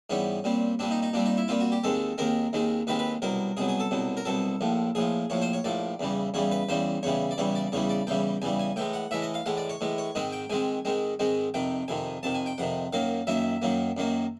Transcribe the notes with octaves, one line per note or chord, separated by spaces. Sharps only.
G#2 E3 G3 B3 C#4
A#2 G3 C4
A#2 G3 C4 D4
D#4
D#4
A#2 G3 C4 D4
D#4
E4
A#2 G3 C4 F4
F#4
G4
D#2 D#3 G#3 C4 A4
D#2 D#3 G#3 C4 A#4
D#2 D#3 G#3 C4
D#2 D#3 G#3 C4 B4
B4
C2 B2 F#3 A#4
C2 B2 F#3 G#4
G#4
A4
C2 B2 F#3
A#4
C2 B2 F#3 A4
A#1 A2 F3
A#1 A2 F3 G#4
A#1 A2 F3 C#5
C5
C#5
A#1 A2 F3 D5
E2 C#3 E3 G3
E2 C#3 E3 G3 C#5
B4
E2 C#3 E3 G3 C5
E2 C#3 E3 G3 C#5
D5
E2 C#3 E3 G3 C#5
D5
E2 C#3 E3 G3 C#5
D5
E2 C#3 E3 G3 G5
E2 C#3 E3 G3 G#5
G#5
A2 E3 G#3 G5
F#5
A2 E3 G#3 E5
D#5
F5
A2 E3 G#3 F#5
D5
C#5
A2 E3 G#3
C#5
G#2 D#3 G#3 C4 D#5
G5
G#2 D#3 G#3 C4 G#5
G#2 D#3 G#3 C4
G#2 D#3 G#3 C4
F2 C3 D#3 G5
F2 C3 D#3 G#5
F2 C3 D#3 A5
G#5
G5
F2 C3 D#3 F#5
F#2 D#3 F#3 A#3 F5
F#2 D#3 F#3 A#3 E5
F#2 D#3 F#3 A#3
F#2 D#3 F#3 A#3